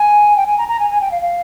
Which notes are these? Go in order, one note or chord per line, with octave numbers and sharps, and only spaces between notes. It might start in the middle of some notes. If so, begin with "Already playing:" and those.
Already playing: G#5
G5
G#5
A#5
A#5
G#5
G#5
G5
F5
F5